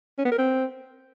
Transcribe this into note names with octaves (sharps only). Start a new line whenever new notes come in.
C#4
B3
A#4
C4